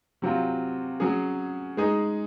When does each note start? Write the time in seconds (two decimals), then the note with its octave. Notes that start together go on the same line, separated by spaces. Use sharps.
0.22 C3 F#3 C4 F4
1.00 F#3 C#4 G#4
1.77 G#3 D#4 G#4